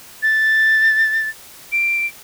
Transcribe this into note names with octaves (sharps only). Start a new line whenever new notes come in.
A6
D7